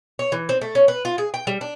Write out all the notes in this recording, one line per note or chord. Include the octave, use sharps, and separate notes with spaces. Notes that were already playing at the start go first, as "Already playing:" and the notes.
C#5
E3
C4
A3
C#4
B4
F4
G#4
G5
G3
D4